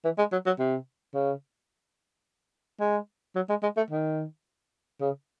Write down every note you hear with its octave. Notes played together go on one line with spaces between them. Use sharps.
E3
G#3
F#3
F#3
C3
C#3
G#3
F#3
G#3
G#3
A3
D#3
C#3